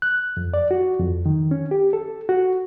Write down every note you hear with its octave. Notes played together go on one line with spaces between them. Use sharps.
F#6
F2
D5
F#4
F2
D#3
C#4
G4
A4
F#4